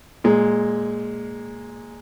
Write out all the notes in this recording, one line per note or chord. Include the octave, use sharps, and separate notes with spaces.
A#2 G#3